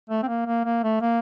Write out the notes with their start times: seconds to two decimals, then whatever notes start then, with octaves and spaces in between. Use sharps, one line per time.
0.10 A3
0.23 C4
0.28 A#3
0.46 A#3
0.65 A#3
0.83 A3
1.01 A#3